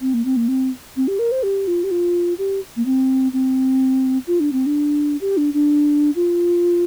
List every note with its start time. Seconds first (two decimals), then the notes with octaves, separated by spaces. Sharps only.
0.01 C4
0.14 A#3
0.25 C4
0.36 A#3
0.48 C4
0.96 C4
1.08 G4
1.19 A#4
1.32 C5
1.43 G4
1.67 F4
1.84 G4
1.91 F4
2.38 G4
2.76 A#3
2.85 C4
3.33 C4
4.27 F4
4.40 D4
4.52 C4
4.66 D4
5.21 G4
5.37 D4
5.54 D4
6.15 F4